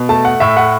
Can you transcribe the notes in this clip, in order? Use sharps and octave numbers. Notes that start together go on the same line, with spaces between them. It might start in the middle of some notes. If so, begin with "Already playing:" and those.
Already playing: B2
A3 A5
F#5
A2 E5
F#5